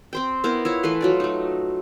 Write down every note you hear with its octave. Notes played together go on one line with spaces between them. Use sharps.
C4 C5 G5
B3 E4 A#4 C5
E4 F4 C#5
E3 A3 B4 C6
F#3 F4 D5
A3 D#4